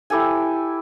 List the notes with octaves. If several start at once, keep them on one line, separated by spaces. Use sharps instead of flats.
E4 G4 A4 G#5